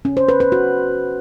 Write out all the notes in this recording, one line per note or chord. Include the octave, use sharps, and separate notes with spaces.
C#4
C5
B4
B4
F#4